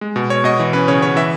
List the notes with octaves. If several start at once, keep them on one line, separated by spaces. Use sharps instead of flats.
G#3
B2
B2 C#5
B2 D#5
E3
C#4 B4
C#3 C#5
C#3 C#5
E3 E5